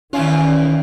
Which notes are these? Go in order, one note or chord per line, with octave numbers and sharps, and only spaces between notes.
E2 D#3 C#4 E4 F4